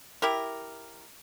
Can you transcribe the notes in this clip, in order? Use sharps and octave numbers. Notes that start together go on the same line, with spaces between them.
E4 G4 A#4